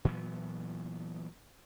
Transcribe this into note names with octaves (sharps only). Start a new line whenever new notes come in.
A#2 E3 F#3 B3